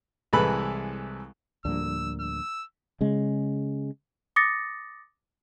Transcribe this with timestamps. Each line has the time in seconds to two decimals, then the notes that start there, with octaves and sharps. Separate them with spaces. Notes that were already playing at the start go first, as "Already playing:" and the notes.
0.33 C2 E3 G#3 A4 B4 B5
1.65 D2 A2 F3 G3 A#3 D4 E6
2.20 E6
3.01 C#3 G#3
4.36 D6 D#6 A6 A#6 C#7